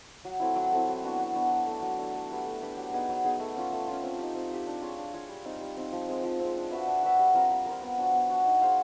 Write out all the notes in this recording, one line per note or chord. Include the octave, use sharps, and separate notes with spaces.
F#3
A3 C4 E4
F#3
A3 C4 E4
F#3
B3 D4 F#4
F#3
B3 D4 F#4
F#3
A3 D4
F#3
A3 D4
A3
D4 G4 B4
A3
D4 G4 B4
F#3
B3 D#4 G#4
F#3
B3 D#4 G#4
A3
C#4 F4
A3
C#4 F4
C4
D#4 G4
C4
D#4 G4
D4
F4 G#4 C#5
D4
F4 G#4 C#5
G3
C4 D#4
G3
C4 D#4
F3
G#3 C4
F3
G#3 C4
D4
F#4 B4 E5
D4
F#4 B4 E5
G3
C4 F4 A#4
G3
C4 F4 A#4
B3
D4 F#4
B3
D4 F#4
D#4
G#4 C5 F5